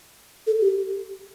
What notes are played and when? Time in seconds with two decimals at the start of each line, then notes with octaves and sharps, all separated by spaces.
0.47 A4
0.61 G4